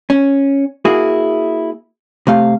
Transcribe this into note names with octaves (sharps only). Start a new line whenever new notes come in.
C#4
A#3 E4 F#4 G#4
C3 A3 F5